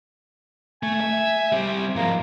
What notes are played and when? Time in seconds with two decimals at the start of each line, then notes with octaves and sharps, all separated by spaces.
0.83 A3 G#5
1.01 E5
1.52 G3 C4
1.96 G#2 F3 A#3